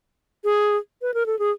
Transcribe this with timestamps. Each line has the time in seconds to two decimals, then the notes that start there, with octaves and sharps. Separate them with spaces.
0.44 G#4
1.02 B4
1.14 A#4
1.26 A4
1.39 G#4